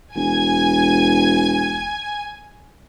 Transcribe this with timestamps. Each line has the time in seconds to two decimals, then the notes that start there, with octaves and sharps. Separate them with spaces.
0.15 E1 G#5